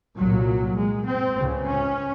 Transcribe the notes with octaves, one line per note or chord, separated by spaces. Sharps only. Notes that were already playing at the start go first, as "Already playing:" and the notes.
C2 A#2 F#3
G#3
C4
C#2 C#3
C#4